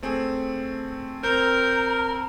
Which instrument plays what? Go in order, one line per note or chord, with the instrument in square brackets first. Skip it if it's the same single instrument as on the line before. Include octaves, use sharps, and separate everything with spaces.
[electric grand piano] A3 C4 G#4
[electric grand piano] C4 [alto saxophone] A#4 [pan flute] A#5 [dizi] G6